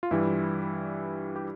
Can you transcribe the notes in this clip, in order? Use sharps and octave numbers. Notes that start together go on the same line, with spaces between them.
F4
G2 E3 G3 E4
G4